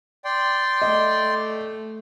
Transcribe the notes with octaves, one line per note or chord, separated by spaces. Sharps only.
D5 G5 C6
A3 D#5